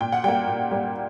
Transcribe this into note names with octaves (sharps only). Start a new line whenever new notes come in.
A#2 G5
F#5
G3 A#3 G5
A#2
G3 A#3